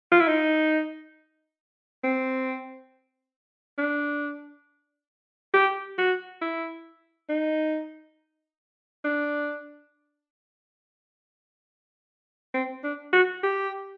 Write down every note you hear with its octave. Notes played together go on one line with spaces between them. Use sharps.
F4
E4
D#4
C4
D4
G4
F#4
E4
D#4
D4
C4
D4
F#4
G4